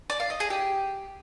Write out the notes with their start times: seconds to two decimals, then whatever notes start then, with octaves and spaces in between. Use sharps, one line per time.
0.10 D5
0.20 F5
0.30 D#5
0.40 G#4
0.50 G4